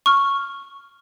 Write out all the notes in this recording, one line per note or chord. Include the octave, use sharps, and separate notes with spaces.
C#6 F6